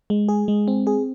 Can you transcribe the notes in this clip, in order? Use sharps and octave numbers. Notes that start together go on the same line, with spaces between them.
G#3
G#4
G#3
C4
G#4